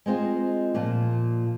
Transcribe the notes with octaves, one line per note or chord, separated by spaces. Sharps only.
G#3 C4 F4 C5 D#5
A#2 F3 A#3